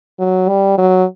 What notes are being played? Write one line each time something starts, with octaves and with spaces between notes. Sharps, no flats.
F#3
G3
F#3